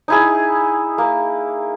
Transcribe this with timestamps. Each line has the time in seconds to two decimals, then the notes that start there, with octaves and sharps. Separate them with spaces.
0.08 D#4 E4 G#4
0.98 A#3